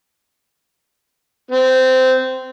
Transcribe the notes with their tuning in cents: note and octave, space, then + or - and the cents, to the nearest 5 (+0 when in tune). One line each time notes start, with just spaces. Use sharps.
C4 -15